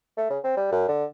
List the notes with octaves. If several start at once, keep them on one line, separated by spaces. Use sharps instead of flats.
A3
C#3
C4
G3
F#2
D3